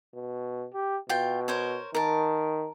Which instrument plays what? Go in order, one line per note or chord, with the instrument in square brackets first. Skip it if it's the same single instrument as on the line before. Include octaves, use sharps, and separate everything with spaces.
[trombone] B2
G4
[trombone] B2 [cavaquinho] F4 G5
[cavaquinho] A#4 C5 C#5
[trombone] D#3 [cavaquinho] A#4 A5